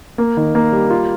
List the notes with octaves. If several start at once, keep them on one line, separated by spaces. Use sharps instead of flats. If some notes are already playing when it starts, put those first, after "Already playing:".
A#3
D#3
A#3
G3
F4